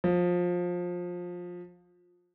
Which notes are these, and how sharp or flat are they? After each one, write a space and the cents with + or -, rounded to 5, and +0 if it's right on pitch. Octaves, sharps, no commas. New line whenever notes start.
F3 +20